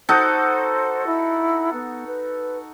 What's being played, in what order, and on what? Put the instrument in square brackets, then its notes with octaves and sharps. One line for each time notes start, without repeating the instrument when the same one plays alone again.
[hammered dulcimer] D#4 F#4 A4 [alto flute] C5
[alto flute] E4
B3
B4